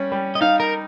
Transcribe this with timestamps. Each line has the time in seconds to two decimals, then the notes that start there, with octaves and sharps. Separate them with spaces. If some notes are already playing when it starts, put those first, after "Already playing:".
Already playing: G3 C#4
0.12 G3
0.35 D#5
0.41 D#4 F5
0.60 A#4